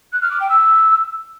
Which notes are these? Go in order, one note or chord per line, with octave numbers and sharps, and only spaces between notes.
F#6
F6
D6
G5
E6